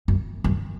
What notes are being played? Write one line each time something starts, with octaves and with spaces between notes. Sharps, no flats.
F#2
F#2